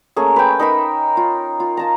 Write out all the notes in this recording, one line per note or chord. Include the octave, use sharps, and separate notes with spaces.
A3 A#3 C#4 G#4
B4 G5
D#4 A#4 E5 B5
F4
F4
F5 A5 A#5